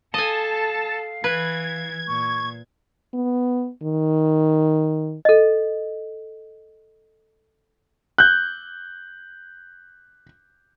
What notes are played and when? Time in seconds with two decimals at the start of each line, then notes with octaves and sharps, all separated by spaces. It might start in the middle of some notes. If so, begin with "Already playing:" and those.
0.14 A4 D#5 F5 G#5 A5
1.24 E3 B4 G#6
2.08 A#2 C#6
3.14 B3
3.83 D#3
5.25 A4 D#5
8.18 F#6 G6